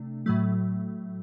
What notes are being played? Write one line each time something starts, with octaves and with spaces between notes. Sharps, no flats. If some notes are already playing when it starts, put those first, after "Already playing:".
Already playing: C3 A3 D4
A2 F#3 A3